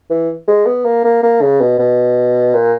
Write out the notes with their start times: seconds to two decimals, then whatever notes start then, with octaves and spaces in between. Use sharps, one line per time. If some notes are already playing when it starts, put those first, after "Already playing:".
0.10 E3
0.48 G#3
0.66 B3
0.85 A#3
1.04 A#3
1.23 A#3
1.41 C#3
1.61 B2
1.79 B2
2.54 A#2